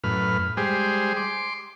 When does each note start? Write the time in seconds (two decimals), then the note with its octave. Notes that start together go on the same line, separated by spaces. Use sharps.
0.04 F#2 A2 B4 F6
0.57 G3 G#3 G4 G#4 C5
1.17 C6 D6